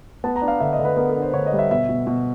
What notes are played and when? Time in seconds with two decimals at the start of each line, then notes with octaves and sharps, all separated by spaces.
0.24 B3 A5
0.36 A#5
0.42 D4
0.48 F5
0.60 D3 E5
0.73 D#5
0.79 D3
0.85 B4
0.97 B3 A#4
1.09 A4
1.15 D4
1.22 C5
1.33 D3 C#5
1.46 D#5
1.53 G3
1.59 E5
1.71 B2 E5
1.89 B2
2.07 B2